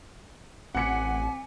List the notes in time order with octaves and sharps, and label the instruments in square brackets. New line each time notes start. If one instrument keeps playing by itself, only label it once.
[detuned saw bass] A1 [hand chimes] C4 D6 B6 [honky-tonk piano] F#5 C#7 [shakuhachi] G#5